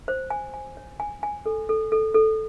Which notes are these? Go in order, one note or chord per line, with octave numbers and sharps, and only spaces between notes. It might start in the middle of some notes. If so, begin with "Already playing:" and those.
C5
G#5
G#5
C#5
G#5
G#5
A4
A4
A4
A4